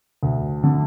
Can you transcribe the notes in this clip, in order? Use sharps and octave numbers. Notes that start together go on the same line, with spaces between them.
D2
D3